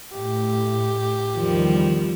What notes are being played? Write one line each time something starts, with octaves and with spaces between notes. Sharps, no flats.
A2 G4
E2 D#3 F3 G3